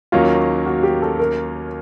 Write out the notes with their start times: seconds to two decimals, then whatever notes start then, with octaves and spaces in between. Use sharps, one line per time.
0.12 D#2 D#3 F#3 A#3 C#4 F4
0.66 F#4
0.83 G4
1.02 A4
1.19 A#4